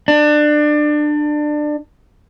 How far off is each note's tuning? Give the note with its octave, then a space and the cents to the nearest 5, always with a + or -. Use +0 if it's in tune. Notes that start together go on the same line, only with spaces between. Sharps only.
D4 +25